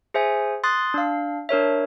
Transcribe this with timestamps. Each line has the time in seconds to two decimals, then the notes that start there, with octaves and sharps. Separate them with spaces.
0.14 G#4 C5 E5 G#5
0.64 C6 D#6 F#6 A6
0.94 D4 F5
1.49 D4 A#4 C#5 E5